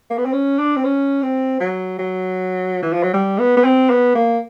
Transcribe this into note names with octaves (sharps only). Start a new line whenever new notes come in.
A#3
B3
C4
C#4
D4
C4
C#4
C4
F#3
F#3
E3
F3
F#3
G3
B3
B3
C4
B3
A#3